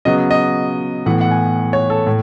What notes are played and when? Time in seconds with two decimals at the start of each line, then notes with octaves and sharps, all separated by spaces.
0.05 C#3 F#3 B3 D#5
0.31 D#5
1.06 A2 E3 B3 F#5
1.21 F#5
1.31 G#5
1.73 C#5
1.90 A4
2.07 A2